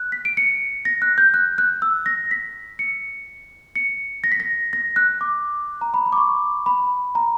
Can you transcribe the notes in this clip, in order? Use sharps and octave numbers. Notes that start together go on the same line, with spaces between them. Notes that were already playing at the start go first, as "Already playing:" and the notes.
Already playing: F#6
B6
D7
C#7
A#6
F#6
G6
F#6
F#6
E6
A#6
B6
C#7
C#7
A#6
B6
A#6
A#6
F#6
D6
A#5
B5
B5
D6
C#6
B5
A#5